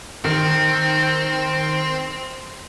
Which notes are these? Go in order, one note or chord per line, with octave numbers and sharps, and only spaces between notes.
D#3 C4